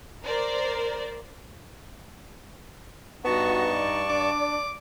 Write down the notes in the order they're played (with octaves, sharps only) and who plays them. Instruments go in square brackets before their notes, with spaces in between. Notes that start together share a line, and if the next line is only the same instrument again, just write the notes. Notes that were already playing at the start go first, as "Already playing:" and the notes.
[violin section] A#4 C5 D5
[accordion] G2 A5 C#6 [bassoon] B3 [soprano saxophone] D#4 [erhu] F#4
[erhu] D5
[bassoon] D4 [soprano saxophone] D6